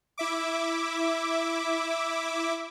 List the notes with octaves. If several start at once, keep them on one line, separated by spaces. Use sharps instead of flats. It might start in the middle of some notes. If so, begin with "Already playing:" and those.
E4 E5 D6